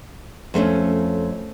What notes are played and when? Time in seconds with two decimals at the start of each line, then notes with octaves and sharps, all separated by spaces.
0.54 F2 A3 C4 C#4